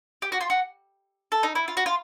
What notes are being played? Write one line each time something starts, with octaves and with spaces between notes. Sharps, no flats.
G4
F#4
F4
F#4
A4
D#4
E4
F4
F#4
F4